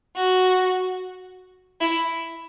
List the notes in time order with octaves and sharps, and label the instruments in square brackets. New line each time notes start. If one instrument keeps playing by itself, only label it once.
[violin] F#4
E4